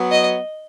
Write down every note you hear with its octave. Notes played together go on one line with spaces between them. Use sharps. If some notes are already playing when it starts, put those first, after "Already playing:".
Already playing: F#3 B3
D#5